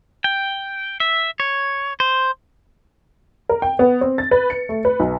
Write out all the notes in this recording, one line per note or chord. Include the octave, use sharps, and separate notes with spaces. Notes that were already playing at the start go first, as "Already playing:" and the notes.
G5
E5
C#5
C5
A#4
G5
B3
C4
A6
B4
C#7
A3
B4
B1